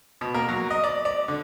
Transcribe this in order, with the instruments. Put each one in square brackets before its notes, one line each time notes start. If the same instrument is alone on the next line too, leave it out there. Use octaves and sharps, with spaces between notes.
[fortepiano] B2
A#3
F#3
D#5
D5
D5
D3